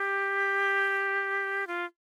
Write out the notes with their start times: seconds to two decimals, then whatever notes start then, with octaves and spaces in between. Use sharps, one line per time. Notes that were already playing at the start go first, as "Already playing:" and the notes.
Already playing: G4
1.67 F4